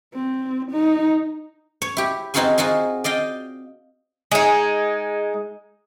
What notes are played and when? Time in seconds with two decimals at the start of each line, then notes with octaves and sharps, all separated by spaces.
0.14 C4
0.71 D#4
1.82 C#5
1.97 E4 G4
2.34 C4 D#4 F4 F#4 G#4 G#5
2.58 D#4 F4 F#4 G#4
3.04 D5 D#5 F5 G5
4.32 G#3 D#4